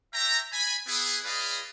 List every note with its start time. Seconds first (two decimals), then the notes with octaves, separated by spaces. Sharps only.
0.13 C#5 E5 G5 A#5
0.52 G#5 B5
0.87 B3 E4 G#4
1.25 F4 G#4 B4 D5 D#5 F5